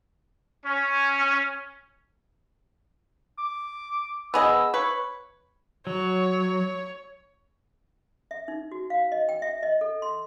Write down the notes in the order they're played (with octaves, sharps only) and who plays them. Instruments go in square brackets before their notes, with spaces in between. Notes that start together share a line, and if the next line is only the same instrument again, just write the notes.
[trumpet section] C#4
[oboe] D6
[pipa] B3 G#4 D#5 [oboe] E6
[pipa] B4 [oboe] C#5
[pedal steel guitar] F#3 [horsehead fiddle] C#5
[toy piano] E5
D#4
F#4
F5
D#5
G5
E5
D#5
A4
C6